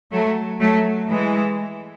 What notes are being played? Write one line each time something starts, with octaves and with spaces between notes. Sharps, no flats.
F#3 A3
F#3 A3
E3 G#3